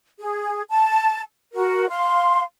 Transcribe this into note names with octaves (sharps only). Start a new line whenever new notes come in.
G#4
A5
F#4 A#4
F5 C6